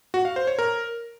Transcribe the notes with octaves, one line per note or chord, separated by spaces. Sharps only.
F#4
F5
C5
C#5
A#4